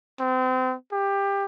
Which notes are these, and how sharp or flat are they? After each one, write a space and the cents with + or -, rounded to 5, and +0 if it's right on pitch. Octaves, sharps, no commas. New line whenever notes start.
C4 -30
G4 +20